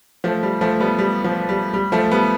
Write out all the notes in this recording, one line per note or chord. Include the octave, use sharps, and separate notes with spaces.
F3 A3
G3
F3 A3
G3 B3
G3
F3
G3
G3
F3 A3
G3 B3